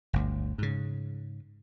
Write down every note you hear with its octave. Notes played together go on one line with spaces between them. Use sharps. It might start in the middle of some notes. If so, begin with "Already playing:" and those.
G1 D2
G#2 C#3